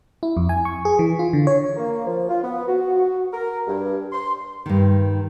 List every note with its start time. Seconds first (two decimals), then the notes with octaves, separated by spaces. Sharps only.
0.23 E4
0.37 F2
0.49 G#5
0.65 C#6
0.85 G#4
0.99 E3
1.19 F4
1.33 D3
1.47 C#5
1.76 A#3
2.06 F3
2.28 F4
2.42 B3
2.67 F#4
3.32 A#4
3.67 G2
4.13 C6
4.66 G2 D#3